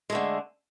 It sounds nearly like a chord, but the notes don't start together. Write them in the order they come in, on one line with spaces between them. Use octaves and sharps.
G#3 A3 D3